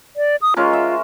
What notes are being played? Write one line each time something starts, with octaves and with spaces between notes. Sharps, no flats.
D5
D#6
G#3 C#4 F4 A#4
E5